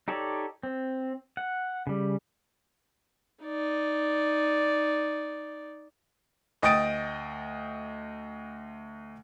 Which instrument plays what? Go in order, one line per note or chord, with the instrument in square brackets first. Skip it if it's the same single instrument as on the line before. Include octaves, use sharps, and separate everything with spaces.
[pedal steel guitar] D#4 G4 A4 C#5 D5
C4
F#5
C#3 G3
[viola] D#4 D5
[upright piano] D2 D#5 G5 D#6 A6 D7